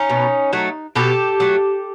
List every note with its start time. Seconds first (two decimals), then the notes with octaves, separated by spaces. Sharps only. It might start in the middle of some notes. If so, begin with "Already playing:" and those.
Already playing: C#4 D#4
0.10 B2
0.53 F#3 A3
0.96 B2 G4 A4
1.40 F#3 A3